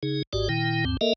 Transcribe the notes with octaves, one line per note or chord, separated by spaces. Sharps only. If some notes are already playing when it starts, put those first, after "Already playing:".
C#3 D#4 G#4
G#1 G#2 F#4 G4 D5
A#2 D#3 E4 G5
D2 G2 C4
A#3 A4 A#4 D#5 E5